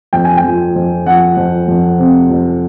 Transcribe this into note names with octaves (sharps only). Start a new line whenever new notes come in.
F2 G5
G#5
G5
F3
F2
F3 F#5
F2
F2
C3
F2